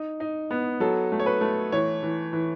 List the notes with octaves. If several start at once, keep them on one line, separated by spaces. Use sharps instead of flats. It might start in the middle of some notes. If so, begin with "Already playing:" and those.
Already playing: D#4
D#4
B3
F#3 A4
A3
C#5
B4
A3
E3 C#5
E3
E3